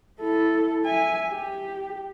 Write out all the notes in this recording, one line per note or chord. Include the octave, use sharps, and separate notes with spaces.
E4 A4
E5 G#5
G4